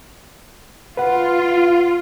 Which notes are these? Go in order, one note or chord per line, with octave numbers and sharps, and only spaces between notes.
F4 B4 F#5